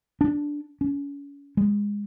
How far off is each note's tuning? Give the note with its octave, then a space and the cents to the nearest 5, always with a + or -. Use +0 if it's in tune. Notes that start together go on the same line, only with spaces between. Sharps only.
D4 -5
C#4 +35
G#3 -20